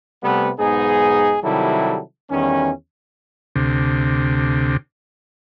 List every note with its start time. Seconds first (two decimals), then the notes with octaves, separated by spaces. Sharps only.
0.23 C3 G3 A3 B3
0.59 B1 G#2 B3 D#4 G#4
1.44 C3 D#3 F#3 G3 E4 A4
2.30 E2 D#3 G3 C#4
3.56 D2 C3